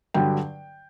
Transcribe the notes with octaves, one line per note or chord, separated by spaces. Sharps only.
G2 D3 F#3 G5